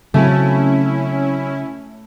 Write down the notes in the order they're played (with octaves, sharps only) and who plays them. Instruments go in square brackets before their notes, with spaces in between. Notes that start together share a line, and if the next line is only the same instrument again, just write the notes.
[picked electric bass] C#3 [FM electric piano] F#3 C4 F#4 [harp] A3 [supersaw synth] C#4 E4